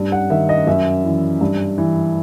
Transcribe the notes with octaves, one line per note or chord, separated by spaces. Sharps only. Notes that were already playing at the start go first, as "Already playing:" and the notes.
Already playing: G2
F#5
D#3 E5
D#5
F#2 E5
E3
G2
E3